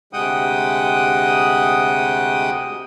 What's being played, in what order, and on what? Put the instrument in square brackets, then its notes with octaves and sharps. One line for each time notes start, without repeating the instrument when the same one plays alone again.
[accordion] D2 C3 G#3 F#5 G5 D#6